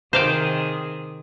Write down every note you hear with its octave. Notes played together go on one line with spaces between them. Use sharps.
C3 D#3 G#4 C5 F5 G5